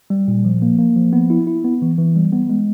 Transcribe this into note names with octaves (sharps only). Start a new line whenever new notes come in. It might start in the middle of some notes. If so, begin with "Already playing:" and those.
G3
A#2
F3
A#3
A#3
F3
B3
E4
E4
B3
E3
E3
G3
B3
G#3